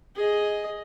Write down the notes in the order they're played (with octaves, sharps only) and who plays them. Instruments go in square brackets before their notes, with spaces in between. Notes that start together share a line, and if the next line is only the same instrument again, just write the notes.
[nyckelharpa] G#4 D#5